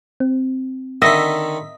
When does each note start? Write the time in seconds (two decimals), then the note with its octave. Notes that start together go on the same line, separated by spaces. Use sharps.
0.20 C4
1.02 D3 D#3 D#5 E5 B6